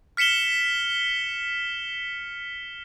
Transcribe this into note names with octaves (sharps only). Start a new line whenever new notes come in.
F6 B6 C#7 E7 G7